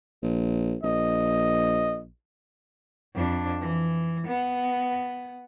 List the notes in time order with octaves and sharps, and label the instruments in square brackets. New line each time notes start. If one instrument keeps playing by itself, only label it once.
[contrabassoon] A#1
[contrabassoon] A#1 [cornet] D#5
[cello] F2 D4
E3
B3